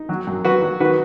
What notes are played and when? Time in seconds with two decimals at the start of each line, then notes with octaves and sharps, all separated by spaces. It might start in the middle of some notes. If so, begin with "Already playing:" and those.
Already playing: D#4
0.09 F#3
0.27 F#2
0.45 F#3 F#4 B4
0.62 F#3
0.80 D#3 F#4 B4